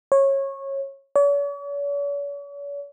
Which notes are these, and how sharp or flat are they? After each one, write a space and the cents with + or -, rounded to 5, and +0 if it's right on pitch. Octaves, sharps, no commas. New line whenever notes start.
C#5 -20
C#5 +45